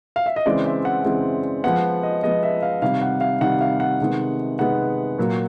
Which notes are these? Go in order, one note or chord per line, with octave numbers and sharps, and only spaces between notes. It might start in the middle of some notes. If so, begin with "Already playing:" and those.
F5
E5
D#5
C#3 E3 G#3 C4 D5
E5
F#5
C#3 E3 G#3 C4
F3 G#3 B3 F#5
D#5
F3 G#3 B3 D#5
E5
F5
C3 D#3 G3 F5
F#5
F5
C3 D#3 G3 F#5
F5
F#5
C3 D#3 G#3 B3
C3 D#3 G#3 B3 F#5
A#2 F#3 A#3